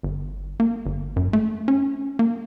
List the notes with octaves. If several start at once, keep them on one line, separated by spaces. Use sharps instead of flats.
G1
A#3
G1
F#2
A3
C#4
A#3